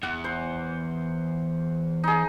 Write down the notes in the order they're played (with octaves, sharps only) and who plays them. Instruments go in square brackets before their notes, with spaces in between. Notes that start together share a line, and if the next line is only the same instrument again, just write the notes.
[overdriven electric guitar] E2 [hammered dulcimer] F#5
[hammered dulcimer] C5
D#4 G#4